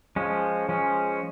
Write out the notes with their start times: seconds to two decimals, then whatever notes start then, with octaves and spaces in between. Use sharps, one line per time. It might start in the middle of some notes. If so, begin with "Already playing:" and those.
0.16 F3 G#3 C#4
0.69 F3 G#3 C#4